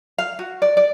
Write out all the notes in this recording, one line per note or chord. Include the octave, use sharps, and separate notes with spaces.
F5
F#4
D5
D5